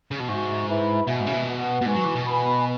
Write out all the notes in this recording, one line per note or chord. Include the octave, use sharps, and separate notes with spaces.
C#3
B2
G#2 F#4 E5 C#6
E4 B4 E5 B5
B2 F#4 E5 G#5
G#2
C#3
B2
F#4 B4 F#5
B2
G#2 F#4 B4 G#5 C#6
F#3
E3
B2
B4 G#5 B5